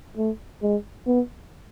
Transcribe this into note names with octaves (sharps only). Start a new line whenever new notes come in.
A3
G#3
B3